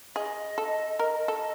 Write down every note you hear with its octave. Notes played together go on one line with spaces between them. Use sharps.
G#4 D#5
A4
A#4
A4